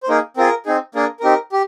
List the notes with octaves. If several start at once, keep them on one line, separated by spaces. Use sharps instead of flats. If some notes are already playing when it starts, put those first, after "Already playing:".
C5
A#3 D#4 G#4 A#4
C4 F4 G#4 A#4
C4 D#4 G#4
A#3 D4 G#4 A#4
C4 D#4 G4 A#4
G4